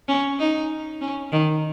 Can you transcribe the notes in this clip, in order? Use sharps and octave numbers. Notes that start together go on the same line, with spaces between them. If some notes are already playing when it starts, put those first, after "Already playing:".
C#4
D#4
C#4
D#3